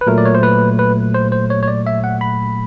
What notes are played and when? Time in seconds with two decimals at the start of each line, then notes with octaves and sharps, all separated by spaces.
0.01 B4
0.07 A#2 F#3 A3 A#4
0.18 D5
0.25 C#5
0.35 C5
0.43 B4
0.79 B4
1.14 C5
1.32 C5
1.50 C#5
1.63 C#5
1.68 D5
1.87 E5
2.04 F#5
2.21 B5